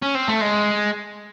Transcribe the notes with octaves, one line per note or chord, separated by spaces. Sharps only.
C#4
C4
A3
G#3